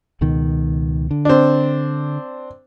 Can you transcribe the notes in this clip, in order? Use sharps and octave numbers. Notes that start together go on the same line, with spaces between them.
C#2 B2 D#3
D3
C4 D4